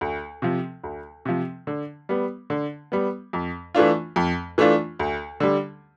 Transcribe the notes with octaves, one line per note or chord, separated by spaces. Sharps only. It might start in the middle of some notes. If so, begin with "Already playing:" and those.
D2
C3 F3
D2
C3 F3
D3
G3 B3
D3
G3 B3
F2
E3 A3 D4 F4
F2
E3 A3 D4 F4
D2
D3 G3